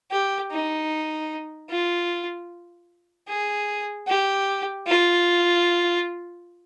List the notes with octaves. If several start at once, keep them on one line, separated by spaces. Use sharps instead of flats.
G4
D#4
F4
G#4
G4
F4